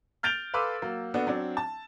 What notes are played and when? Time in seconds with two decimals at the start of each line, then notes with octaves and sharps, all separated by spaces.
0.23 F6 G6 A6 D7 F7 G7
0.54 A4 B4 F5 C6 D6 E6
0.82 F#3 A#3
1.14 B3 D4 F#4 A4
1.27 F#3 C4 D4
1.57 A5